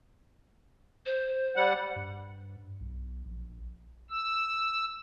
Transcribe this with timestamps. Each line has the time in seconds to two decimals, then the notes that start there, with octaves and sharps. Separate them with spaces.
1.06 C5
1.56 G3 F#5
1.96 G2
2.80 B1
3.25 A#1
4.10 E6